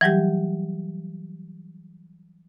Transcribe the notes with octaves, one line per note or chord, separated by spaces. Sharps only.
E3 F#3 G3 G4